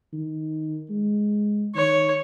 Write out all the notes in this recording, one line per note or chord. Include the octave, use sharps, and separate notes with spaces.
D#3
G#3
D#3 C#5